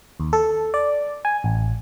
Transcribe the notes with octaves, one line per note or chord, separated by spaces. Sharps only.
D#2
A4
D5
G#5
A1